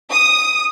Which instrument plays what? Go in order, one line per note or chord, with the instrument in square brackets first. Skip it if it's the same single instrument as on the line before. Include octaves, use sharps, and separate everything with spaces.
[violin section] D#6